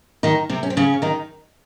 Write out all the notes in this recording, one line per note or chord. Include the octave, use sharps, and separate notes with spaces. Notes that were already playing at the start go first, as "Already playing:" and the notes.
D#3 D#4
C3 C4
C#4
C4
C#3 C#4
D#3 D#4